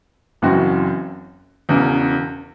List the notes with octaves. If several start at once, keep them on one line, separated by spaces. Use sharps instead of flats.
F#1 F#2 E3 C4 F#4
E1 E2 C#3 E3